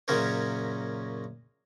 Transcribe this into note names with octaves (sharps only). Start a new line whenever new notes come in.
F#2 A#2 C#3 C#4 A#4 C5